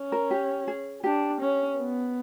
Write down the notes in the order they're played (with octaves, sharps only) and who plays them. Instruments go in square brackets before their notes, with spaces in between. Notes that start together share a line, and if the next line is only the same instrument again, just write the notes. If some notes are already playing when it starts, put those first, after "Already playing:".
Already playing: [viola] C#4
[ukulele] A#4
G4
G#4
[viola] D4 [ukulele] G4
[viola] C#4
B3